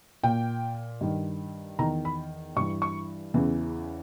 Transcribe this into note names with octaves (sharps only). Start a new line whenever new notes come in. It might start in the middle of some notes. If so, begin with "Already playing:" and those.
A#2 G5
G2 D#3
E2 D#3 A#5
B5
G2 E3 C#6
C#6
E2 C#3 E3